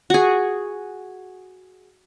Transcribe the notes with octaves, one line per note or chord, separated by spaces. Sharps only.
F#4 G#4